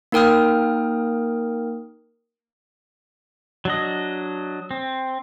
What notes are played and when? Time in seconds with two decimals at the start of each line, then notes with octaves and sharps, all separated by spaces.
0.12 A#3 D#4 A#4 G5 D#6 F6
3.65 F#3 D4 D#5
4.71 C4